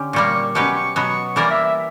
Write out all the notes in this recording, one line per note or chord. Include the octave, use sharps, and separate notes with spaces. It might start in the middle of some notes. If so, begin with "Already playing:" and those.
Already playing: D3 C#4 G4
A#2 G3 A#3 C#6
B2 F#3 C#4 G4 B4 C#6
C#6
B2 F#3 B3 C#6
E3 G3 A#3 E4 A#4 D5
E5
E5